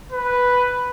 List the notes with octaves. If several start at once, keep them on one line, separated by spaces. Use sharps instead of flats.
B4